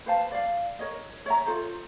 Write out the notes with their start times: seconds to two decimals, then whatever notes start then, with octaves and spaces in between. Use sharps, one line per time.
0.06 B4 C5 F5 A5
0.31 D5 F5
0.79 A#4 C#5 D#5
1.26 C#5 E5 A#5
1.46 F4 A4 C5